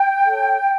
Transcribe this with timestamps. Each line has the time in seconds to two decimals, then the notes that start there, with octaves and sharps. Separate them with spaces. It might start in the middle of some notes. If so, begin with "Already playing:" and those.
Already playing: G5
0.26 A4 C#5